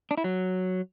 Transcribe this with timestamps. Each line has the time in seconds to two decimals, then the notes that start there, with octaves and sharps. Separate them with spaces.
0.11 D4
0.18 E4
0.24 F#3